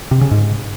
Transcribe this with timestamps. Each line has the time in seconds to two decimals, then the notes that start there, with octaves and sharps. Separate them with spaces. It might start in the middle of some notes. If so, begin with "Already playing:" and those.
0.11 C3
0.21 C#3
0.31 G#2